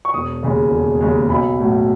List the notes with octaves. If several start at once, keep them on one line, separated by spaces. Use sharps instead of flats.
C#6
E1 D#6
D#2 C#3 G#3
E1
D#2 C#3 G#3
B1 B5
A2 F#3